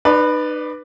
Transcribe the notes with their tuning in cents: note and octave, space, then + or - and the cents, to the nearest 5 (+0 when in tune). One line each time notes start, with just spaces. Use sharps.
D#4 -40 B4 +0 D5 +0